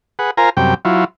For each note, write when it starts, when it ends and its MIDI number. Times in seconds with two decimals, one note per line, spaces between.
0.19 0.31 68
0.19 0.31 71
0.19 0.31 78
0.37 0.50 65
0.37 0.50 70
0.37 0.50 72
0.37 0.50 80
0.37 0.50 82
0.57 0.74 42
0.57 0.74 48
0.57 0.74 55
0.57 0.74 79
0.85 1.04 54
0.85 1.04 64
0.85 1.04 65